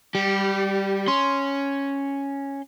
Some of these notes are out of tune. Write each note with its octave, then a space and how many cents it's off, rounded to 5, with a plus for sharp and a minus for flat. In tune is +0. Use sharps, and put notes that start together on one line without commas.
G3 +5 G4 -20
C#4 +0 C6 +0